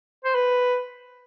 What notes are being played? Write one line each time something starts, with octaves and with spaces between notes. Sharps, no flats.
C5
B4